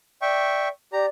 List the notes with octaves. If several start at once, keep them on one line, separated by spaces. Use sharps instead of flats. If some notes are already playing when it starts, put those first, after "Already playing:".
D5 E5 G5 C#6
G4 D5 A#5